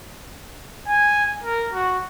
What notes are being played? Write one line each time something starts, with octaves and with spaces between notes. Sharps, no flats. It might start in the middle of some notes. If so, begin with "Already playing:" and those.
G#5
A#4
F#4